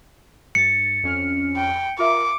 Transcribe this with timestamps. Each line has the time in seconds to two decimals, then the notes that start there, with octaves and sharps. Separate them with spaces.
0.55 G2 A6 C#7
1.03 F2 C#4 F6
1.57 G5
1.99 F4 A#4 E5 D6